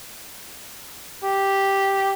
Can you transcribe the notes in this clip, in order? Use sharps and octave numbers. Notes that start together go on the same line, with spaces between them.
G4